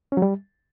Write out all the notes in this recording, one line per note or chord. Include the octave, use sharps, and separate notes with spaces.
C#4
F#3
G3